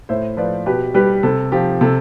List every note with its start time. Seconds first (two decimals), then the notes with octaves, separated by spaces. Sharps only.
0.09 A2 C5 E5
0.37 F3 B4 D5
0.66 B2 G4 B4
0.94 G3 G4 B4
1.23 C3 A4
1.52 F3 G4
1.81 C3 A4